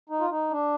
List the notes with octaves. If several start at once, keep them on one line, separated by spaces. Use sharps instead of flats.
D#4
F4
D#4
D4